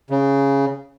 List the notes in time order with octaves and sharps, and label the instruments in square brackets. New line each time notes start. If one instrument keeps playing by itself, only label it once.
[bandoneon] C#3